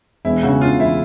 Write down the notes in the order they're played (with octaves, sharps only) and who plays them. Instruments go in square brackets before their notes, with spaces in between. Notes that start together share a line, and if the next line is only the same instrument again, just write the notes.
[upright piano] E1 [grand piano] E4
[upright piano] C#3 [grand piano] F#4
[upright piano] C#3 [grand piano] F4
[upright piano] E1 [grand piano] E4